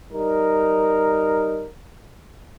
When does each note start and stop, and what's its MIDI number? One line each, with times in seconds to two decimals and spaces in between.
0.13 1.67 55
0.13 1.67 63
0.13 1.67 70